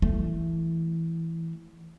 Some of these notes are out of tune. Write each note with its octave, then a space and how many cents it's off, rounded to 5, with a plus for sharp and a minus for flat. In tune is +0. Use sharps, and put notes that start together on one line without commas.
E3 +0 A3 +0